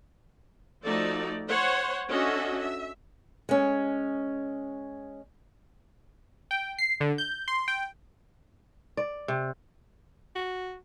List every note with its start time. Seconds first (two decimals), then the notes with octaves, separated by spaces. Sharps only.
0.85 F3 A3 D#4 F#4 A4 D5
1.48 C5 C#5 F#5 C6
2.09 C#4 D4 F#4 A4 D#5 E5
2.60 E5
3.49 G#3 C#4
6.51 G5
6.78 C7
7.00 D3
7.18 G6
7.48 C6
7.68 G5
8.97 D5
9.28 C3
10.35 F#4